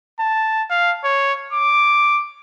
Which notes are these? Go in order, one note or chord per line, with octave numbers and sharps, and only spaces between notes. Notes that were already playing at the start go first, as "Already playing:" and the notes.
A5
F5
C#5
D6